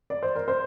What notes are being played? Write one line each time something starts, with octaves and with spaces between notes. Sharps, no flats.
D5
C5
A#4
C5